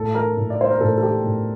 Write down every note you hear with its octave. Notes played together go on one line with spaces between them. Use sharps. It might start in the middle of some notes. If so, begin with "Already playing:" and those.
Already playing: A2 A4
A#4
A2
D5
C5
A#4
A2 A4
A4
G4
A2